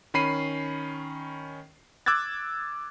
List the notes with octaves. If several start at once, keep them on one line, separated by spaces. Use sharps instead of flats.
D#3 C#4 B5 C7 D#7
D6 E6 F#6 G#6 A6